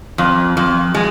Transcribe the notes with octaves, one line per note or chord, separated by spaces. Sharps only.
F2
F2
G#3